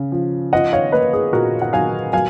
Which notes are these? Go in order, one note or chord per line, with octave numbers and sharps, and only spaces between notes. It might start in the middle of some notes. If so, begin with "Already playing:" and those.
Already playing: C#3
F3
F4 D#5 F#5
C#5 F5
A#3 B4 D#5
G#4
A#2 F#4 A#4
F#5
F#3 F5 G#5
F#3 F5 G#5